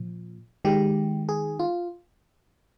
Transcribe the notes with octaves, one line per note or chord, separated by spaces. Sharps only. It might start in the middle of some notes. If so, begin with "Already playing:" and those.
Already playing: A#2 F3
D#3 G#3 G4
G#4
F4